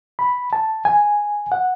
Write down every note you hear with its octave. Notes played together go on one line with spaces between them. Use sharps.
B5
A5
G#5
F#5